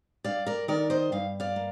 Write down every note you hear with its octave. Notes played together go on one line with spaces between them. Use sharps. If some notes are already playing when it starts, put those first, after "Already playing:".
G2 D5 F5
A#4 D5
D#3 A#4 D5
C5 D#5
G2 F5
D5 F5
A#3